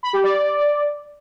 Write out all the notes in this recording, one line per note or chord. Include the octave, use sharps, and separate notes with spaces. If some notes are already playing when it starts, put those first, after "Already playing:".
B5
G4
D5